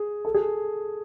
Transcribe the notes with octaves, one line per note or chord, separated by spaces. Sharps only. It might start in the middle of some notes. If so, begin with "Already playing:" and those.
Already playing: G#4
A4
G#4